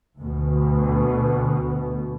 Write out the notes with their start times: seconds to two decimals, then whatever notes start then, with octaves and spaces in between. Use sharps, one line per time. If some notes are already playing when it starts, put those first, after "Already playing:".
0.18 D2 B2